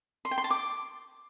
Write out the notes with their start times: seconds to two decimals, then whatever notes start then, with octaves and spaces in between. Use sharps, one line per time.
0.25 C6
0.31 G5
0.38 C6
0.44 A5
0.51 D6